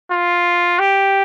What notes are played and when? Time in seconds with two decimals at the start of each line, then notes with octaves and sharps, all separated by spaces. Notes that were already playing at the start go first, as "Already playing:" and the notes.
0.11 F4
0.79 G4